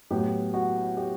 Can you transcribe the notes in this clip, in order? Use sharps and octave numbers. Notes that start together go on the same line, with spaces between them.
A2 F#3 B3 G4
F#4
G4